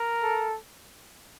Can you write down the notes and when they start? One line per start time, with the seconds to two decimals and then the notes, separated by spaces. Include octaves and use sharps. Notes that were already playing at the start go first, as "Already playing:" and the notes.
Already playing: A#4
0.22 A4